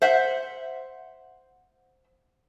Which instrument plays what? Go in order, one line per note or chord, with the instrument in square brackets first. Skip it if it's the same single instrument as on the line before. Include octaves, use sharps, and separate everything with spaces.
[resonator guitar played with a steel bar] C5 E5 F#5